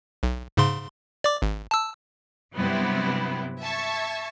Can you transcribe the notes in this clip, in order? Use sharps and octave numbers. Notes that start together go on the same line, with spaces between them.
B1
G#2 C#3 C6
D5 D6
G#1
A5 E6
G2 C3 F#3 B3 C4 E4
E5 A5 C#6 G#6